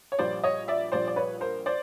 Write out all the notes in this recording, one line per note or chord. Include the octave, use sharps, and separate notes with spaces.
C#5
A#1 A#2 G3 C5 D5
C#5 D#5
D5 E5
A#1 A#2 G3 C5 D5
D5
B4 C#5
A#4 C5
C5 D5